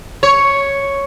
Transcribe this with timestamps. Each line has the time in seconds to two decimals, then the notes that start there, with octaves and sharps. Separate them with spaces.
0.23 C#5